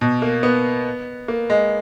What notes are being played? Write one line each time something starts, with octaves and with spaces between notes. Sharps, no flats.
B2
A#3
B3
A#3
G#3